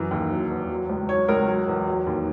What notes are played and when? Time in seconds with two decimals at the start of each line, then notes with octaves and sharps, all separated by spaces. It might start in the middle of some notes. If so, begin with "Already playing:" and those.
Already playing: F#2 E3
0.11 D#2
0.31 F#3
0.50 E2
0.69 F#3
0.89 C#2
1.09 F#3 C#5
1.28 C#2 A#4
1.48 F#3
1.68 E2
1.87 F#3
2.07 D#2